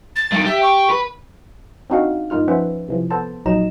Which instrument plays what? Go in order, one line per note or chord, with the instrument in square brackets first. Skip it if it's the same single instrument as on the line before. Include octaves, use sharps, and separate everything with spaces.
[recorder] A6
[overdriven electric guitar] G2 D#3
[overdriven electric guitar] G4 [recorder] E5
[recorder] C#6
[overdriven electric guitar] B4
[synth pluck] C4 D4 D#4 F#4 F5 F#5
G2 A#3 D#4 F4 F6
F3 C#4 B4 C5 E5 F#5
C3 E3 F3
B3 A4 C5 A5
A#1 A#2 F#3 D#4 A#5 E7